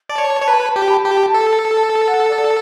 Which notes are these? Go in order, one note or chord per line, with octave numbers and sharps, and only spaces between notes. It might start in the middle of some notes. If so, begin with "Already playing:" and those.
D5 A5
C#5
A5
C#5
B4 B5
A5
G4 A5
B5
G4 A5
A4
A5
A5
F#5
D5